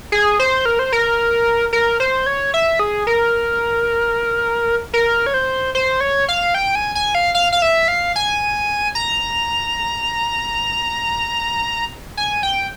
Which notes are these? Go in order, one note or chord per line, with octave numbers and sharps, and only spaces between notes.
G#4
C5
A#4
C5
A#4
A#4
C5
C#5
E5
G#4
A#4
A#4
C#5
C5
C5
C#5
F5
G5
G#5
G#5
F5
F5
F5
E5
F5
G#5
A#5
G#5
G5